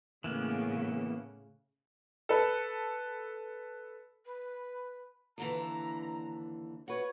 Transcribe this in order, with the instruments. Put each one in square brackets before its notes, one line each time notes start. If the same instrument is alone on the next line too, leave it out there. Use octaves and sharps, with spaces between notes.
[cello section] A2 C#3 [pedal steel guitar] E3 A#3 B3
[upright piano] A4 B4
[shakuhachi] B4
[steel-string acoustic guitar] D#2 D3 E3 [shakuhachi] A#5
[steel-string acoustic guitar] F#4 B4 [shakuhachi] C#5